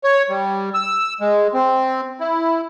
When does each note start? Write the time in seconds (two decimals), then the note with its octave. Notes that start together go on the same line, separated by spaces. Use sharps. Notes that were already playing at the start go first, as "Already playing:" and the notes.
0.04 C#5
0.29 G3
0.74 E6
1.21 G#3
1.54 C4
2.20 E4